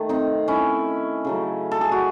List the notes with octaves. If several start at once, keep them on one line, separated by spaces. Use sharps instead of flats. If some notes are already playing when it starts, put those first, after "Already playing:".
Already playing: D#3 A3
C4 D#4
C#4 E4
C#3 F#3 A3
A4
G#4
F#4